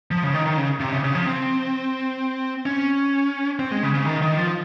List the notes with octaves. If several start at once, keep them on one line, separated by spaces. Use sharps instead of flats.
F3
C#3
D#3
D#3
C#3
C3
C#3
C#3
F3
C4
C#4
C4
G#3
C#3
C#3
D#3
D#3
F3